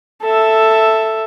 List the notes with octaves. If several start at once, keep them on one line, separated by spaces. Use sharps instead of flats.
A4 E5